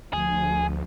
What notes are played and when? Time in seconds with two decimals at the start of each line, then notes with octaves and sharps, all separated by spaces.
0.13 D2 F3 G#4